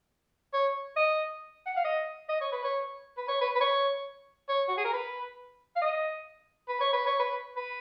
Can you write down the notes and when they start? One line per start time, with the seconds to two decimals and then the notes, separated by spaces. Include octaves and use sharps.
0.53 C#5
0.96 D#5
1.66 F#5
1.77 F5
1.84 D#5
2.29 D#5
2.41 C#5
2.52 B4
2.64 C#5
3.17 B4
3.28 C#5
3.41 B4
3.55 B4
3.61 C#5
4.49 C#5
4.68 F#4
4.77 G#4
4.85 A#4
4.93 B4
5.76 F5
5.81 D#5
6.68 B4
6.81 C#5
6.93 B4
7.06 C#5
7.19 B4
7.57 B4